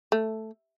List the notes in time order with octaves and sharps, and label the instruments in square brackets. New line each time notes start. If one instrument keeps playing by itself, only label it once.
[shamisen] A3